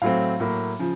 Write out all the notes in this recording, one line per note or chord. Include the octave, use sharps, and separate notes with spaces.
A2 F#3 A3 C4 F5
A2 F#3 A#3
C#3 F3